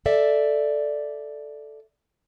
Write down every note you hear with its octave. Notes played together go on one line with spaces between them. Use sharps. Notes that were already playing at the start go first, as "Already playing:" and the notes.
A4 D5 E5